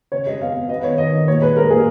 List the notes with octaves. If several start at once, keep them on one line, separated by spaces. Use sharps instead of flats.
C#3 C#5
G#3 D#5
B3 F5
B3
B3 D#5
B4
D#3 C#5
D#3 D#5
D#3
A#2 C#5
G#3 B4
G#3 A#4
A#2 G#4